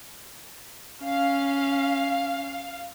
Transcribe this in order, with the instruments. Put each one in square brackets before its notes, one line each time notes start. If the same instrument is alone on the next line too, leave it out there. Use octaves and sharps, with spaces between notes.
[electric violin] C#4 [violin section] F5